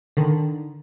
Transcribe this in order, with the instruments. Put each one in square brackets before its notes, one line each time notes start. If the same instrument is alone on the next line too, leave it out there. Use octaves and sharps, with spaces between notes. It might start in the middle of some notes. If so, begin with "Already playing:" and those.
[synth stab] D3 D#3